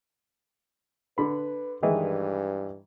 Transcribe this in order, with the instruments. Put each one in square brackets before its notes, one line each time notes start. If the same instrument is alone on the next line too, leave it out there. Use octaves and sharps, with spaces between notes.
[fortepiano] D3 B5 [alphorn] B4
[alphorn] G2 [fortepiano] D#3 E3 G#3